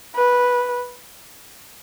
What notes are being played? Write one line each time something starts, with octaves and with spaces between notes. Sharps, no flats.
B4